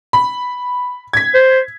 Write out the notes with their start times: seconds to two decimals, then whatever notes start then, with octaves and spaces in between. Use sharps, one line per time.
0.13 B5
1.13 G#6 B6
1.34 C5